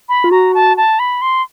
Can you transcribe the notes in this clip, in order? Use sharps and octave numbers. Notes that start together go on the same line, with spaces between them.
B5
F4
F#4 A#5
A5
A5
B5
C6